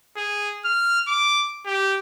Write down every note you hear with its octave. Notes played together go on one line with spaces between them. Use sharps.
G#4
F6
D6
G4